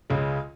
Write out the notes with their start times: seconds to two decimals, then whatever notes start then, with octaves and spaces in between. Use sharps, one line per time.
0.10 C#2 C#3 G#3